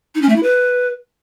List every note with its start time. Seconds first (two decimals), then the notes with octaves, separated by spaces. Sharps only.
0.15 D#4
0.22 C#4
0.29 A3
0.36 E4
0.43 B4